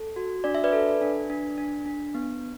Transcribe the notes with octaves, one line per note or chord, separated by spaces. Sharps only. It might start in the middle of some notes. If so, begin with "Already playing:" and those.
Already playing: A4
F#4
D4 D5
E5
B4 D5
A4
D4
D4
D4
D4
B3